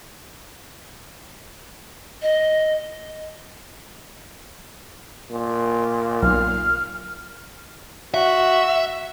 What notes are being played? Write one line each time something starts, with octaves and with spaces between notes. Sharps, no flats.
D#5
A#2
B1 F6
F#4 E5